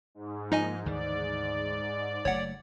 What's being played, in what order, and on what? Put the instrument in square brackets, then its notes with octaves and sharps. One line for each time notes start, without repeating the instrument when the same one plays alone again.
[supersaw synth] G#2
[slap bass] F3 [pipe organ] A#3 [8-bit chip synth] D#4 D#5 G#5
[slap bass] D2 D#3 E3 [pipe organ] D5
[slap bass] F#1 F#3 A3 [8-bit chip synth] C#5 F#5